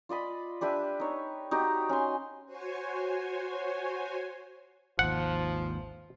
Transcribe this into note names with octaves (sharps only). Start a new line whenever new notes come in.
F4 D5 D#5 B5
D4 G4 B4 E5
D#4 C#5
D#4 F#4 G4 D#5
C#4 G#5 C6
F#4 C5 C#5 G#5
G#1 D#2 F3 F#5